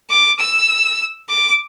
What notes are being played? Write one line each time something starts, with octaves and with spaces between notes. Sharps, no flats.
D6
E6
D6